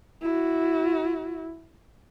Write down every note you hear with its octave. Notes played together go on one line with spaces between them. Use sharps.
E4 F#4